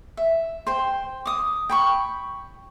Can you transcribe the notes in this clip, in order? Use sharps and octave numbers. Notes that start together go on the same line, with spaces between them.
E5
C5 G5
D6 D#6
G5 B5 C#6